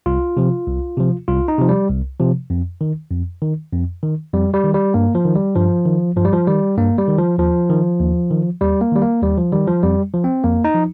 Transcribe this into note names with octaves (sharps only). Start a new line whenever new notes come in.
C2 F4
C3 F3
C2
C3 F3
C2 F4
D#4
C3 F3
G3
C2
C3 F3
F2
D#3
F2
D#3
F2
D#3
F2 G3
G3
D#3
G3
G2 A#3
F3
D#3
G3
G2 F3
D#3
G2 F3
G3
F3
D#3 G3
G2 A#3
G3
D#3
F3
D#2 F3
D#3
D#2
D#3
D#2 G3
A#3
D#3 G3
A#3
D#2 G3
F3
D#3 G3
F3
F2 G3
F3
C4
F2 A#3
D#4
F3